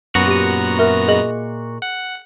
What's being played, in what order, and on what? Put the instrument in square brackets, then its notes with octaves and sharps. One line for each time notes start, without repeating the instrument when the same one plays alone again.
[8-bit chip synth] F#2 B3 A#5 [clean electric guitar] A#2 F#4
[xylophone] G4 D#7
A#4 E5
G#4 D#5 F#7
[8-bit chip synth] F#5